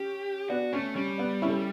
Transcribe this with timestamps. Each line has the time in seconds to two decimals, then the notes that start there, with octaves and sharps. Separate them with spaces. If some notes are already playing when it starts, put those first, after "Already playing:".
Already playing: C#4 G4
0.49 B3 D4 F#4
0.73 A3 C#4
0.96 G3 C#4
1.18 B3 D4
1.42 C#4 E4
1.49 A4